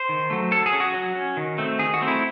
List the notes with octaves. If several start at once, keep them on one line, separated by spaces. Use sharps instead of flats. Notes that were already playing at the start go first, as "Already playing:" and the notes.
Already playing: C5
D#3
F#3 A3
F#3 A4
G#4
C#4
F#4
F#3
C#4
D#3
A3 C4
D#3 G#4
F#4
A3 C4
E4